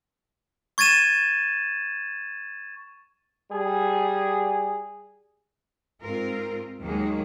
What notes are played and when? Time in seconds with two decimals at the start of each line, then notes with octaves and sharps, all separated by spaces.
0.78 C#6 G#6 A6 D#7 E7
3.51 G3 G#4
6.01 G#2 C4 F4 A#4
6.81 D#2 D#3 F#3 G#3 A#3 G#4